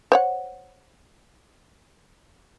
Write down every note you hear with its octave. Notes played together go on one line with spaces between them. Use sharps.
C5 C#5 F#5